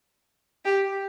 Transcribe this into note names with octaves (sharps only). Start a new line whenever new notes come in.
G4